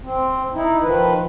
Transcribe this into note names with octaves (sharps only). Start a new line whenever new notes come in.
C4
D#4 E4
D#3 F3 B4